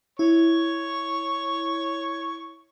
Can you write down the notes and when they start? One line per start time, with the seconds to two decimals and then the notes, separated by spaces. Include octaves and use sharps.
0.19 E4 C#5 C#6